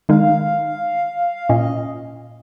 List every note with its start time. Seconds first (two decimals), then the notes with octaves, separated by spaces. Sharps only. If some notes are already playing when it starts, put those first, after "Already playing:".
0.09 D#3 G#3 D#4 F5
1.49 A#2 C#4 D#5